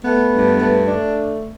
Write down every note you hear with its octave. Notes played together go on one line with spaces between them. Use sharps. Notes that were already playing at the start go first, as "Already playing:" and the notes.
A3 B3
G2
A3
A3 D4